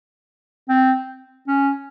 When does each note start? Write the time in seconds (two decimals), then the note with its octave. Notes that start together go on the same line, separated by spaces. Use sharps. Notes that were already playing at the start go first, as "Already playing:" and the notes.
0.69 C4
1.47 C#4